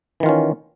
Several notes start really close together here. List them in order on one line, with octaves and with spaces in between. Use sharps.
E3 D#3 F4 C#4